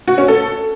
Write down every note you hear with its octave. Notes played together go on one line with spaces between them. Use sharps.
F#4
C#4
A4